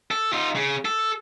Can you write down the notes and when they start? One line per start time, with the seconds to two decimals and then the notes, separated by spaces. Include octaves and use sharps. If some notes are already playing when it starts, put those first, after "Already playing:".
0.11 A4
0.33 D#4 F4
0.56 C#3
0.85 A4